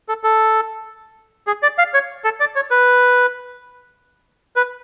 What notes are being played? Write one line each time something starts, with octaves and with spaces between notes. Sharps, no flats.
A4
A4
G#4
D5
F5
C#5
A4
D5
C#5
B4
B4